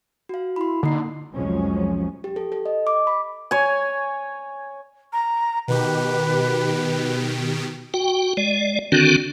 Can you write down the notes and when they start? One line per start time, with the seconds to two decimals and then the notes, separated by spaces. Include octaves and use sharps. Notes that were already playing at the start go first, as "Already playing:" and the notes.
0.29 F#4 F5
0.56 E4 B5 C6
0.83 D3 A#3 D#4 C7
1.33 C2 F2 F3 F#3 G#3 C#4
2.24 G4
2.36 A4
2.52 A4
2.66 D#5
2.87 D6
3.07 B5
3.51 C#5 G#5
5.13 A#5
5.68 B2 D#3 G4 B4
7.94 F#4 G5
8.37 G#3 D5
8.92 D3 D#3 C4 D4 F#4